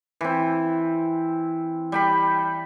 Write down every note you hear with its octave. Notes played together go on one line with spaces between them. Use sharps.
E3 C4
G3 G5 B5